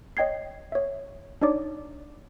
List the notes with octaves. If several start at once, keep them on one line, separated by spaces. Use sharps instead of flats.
C#5 D#5 G5 G#6 C7
C#5 E5
D4 D#4 C#5 D5 D6